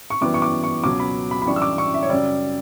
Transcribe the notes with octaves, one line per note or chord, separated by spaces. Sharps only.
C#6
F#2 E3 G3 B3 D6
C#6
D6
C#6
C#2 B2 F#3 D6
B5
B5
B5
F#2 E3 G3 D4 C#6
E6
D6
C#6
E5
C#5
F#2 C#3 G3 D5